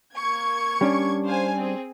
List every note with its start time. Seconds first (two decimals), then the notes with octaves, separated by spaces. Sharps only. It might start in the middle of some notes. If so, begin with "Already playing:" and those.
0.14 A#3 C#6 G#6
0.81 G3 C#4 D4
1.25 C5 F5 G#5
1.56 C4 G#4